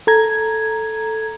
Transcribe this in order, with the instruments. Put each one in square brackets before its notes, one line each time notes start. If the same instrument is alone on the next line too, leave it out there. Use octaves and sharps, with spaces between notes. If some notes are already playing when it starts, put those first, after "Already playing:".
[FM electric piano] A4 A#5 G#6